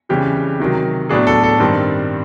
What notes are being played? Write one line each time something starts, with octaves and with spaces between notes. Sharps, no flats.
F2 C#3 E3 G3 G4
C3 D#3 F#3
A2 F#3 B3 D4 G#4
A4
A4
G2 D#3 G3 C4